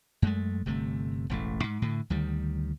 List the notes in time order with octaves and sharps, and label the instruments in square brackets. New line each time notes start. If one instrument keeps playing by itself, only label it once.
[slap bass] F#2 G#3 A3
G1 C3 A3
E1 A1 A3
G#2
A2 D3
D2 D#3 G3